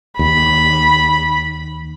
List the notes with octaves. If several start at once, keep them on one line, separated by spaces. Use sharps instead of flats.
D#2 B5